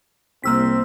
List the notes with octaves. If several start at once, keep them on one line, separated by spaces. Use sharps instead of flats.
C2 A#3 C4 E6 B6